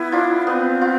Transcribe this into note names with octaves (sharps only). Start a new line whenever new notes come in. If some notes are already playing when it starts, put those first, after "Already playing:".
Already playing: B3 E4
D4 F4
B3 C4
F4